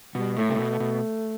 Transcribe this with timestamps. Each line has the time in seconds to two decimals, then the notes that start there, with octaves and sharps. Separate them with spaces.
0.15 B2 G3
0.37 A2 A3
0.49 C3
0.59 B2
0.80 B2